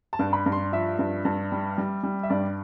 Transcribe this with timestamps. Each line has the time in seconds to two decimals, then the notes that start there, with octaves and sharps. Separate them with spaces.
0.13 A5
0.19 G2
0.33 B5
0.46 G2
0.52 C6
0.72 F3 E5
0.99 G2
1.25 G2
1.52 G3
1.78 G3
2.04 G3
2.23 E5
2.30 G2 D5